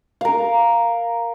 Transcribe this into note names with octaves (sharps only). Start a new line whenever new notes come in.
A#4 F5